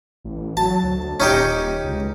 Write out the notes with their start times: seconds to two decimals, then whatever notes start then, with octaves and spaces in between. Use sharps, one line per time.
0.24 A1
0.57 F#3 A5
0.83 D2
1.20 D#1 C#4 D#4 G4
1.84 C#2